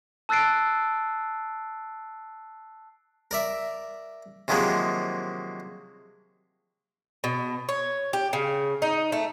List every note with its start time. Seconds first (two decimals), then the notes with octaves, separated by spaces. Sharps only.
0.29 A5 E6 F#6 A6 C7 D7
3.31 A#4 D5 E5
4.48 C3 D#3 F3 F#3 G#3 A#3
7.24 B2
7.69 C#5
8.13 G4
8.33 C#3
8.82 D#4
9.12 A3